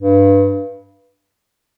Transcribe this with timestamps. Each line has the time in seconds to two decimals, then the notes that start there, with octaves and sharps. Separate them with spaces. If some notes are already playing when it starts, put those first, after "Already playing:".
0.01 G2